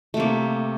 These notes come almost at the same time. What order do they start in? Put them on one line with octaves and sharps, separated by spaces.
A3 C3 A#3